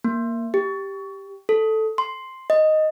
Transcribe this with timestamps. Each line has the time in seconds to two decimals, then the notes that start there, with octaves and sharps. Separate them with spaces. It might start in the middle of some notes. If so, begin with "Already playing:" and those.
0.04 A#3
0.54 G4
1.49 A4
1.98 C6
2.50 D#5